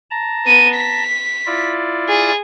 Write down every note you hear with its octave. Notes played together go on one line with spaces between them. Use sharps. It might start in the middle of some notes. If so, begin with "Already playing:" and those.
A5 A#5
B3 D#7
B6
E4 F4 D5
G#4